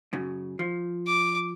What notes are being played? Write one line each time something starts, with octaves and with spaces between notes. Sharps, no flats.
F#2 C#3
F3
D6